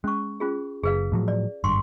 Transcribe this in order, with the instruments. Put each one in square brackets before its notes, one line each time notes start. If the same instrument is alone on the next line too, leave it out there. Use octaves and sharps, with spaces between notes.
[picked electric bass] G#3 [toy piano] C#4 C#6
[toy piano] C#4 F4 G#4
[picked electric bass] F#1 [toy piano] G#4 B4 F5
[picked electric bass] A2 F3 F#3
[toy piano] D5
[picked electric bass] G#1 G2 [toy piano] C6 C#6